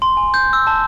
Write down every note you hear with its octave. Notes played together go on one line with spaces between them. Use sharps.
C6
G#5
G6
E6
A5